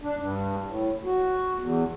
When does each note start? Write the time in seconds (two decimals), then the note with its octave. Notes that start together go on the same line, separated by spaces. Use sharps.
0.02 D4
0.19 G2
0.66 A2
1.05 F#4
1.59 E2